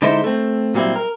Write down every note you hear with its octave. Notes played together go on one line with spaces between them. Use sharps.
D3 G#3 D#4 E4 C5
A3 C4
A#2 F#3 G3 C4 E4
A#4